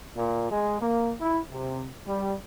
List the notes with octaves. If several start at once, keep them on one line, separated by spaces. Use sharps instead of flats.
A#2
G#3
A#3
E4
C3
G3